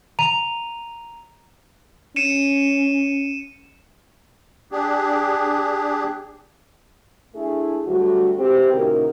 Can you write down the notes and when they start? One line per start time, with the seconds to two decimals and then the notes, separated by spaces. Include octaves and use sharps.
0.19 A#5 D#7 F7
2.16 C#4 C#7 D#7 E7
4.72 D4 G4 G#4
7.35 A3 D4 E4 G#4
7.87 D2 F#3 G3 A3 F#4
8.38 E2 G#3 C4 G4
8.73 E2 A#2 C#3 D#4 F#4 A#4